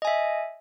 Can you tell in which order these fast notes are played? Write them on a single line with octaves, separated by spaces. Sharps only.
D#5 G#5 E5